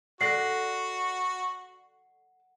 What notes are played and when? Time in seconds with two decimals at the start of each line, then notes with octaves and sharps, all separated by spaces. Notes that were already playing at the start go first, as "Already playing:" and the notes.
0.21 F#4 A4 D5 F#5 F#6 A#6 C7